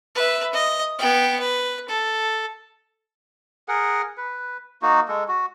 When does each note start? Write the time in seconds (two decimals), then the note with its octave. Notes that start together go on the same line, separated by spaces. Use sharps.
0.15 B4 E5
0.53 D#5
0.99 B3 G5
1.40 B4
1.88 A4
3.68 G#4 A#4 F#5
4.17 B4
4.82 A#3 D#4 F#4
5.08 G#3 A4
5.28 F#4